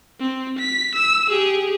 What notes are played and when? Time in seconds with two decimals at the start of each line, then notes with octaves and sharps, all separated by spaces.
0.20 C4
0.59 B6
0.95 E6
1.30 G4 G#4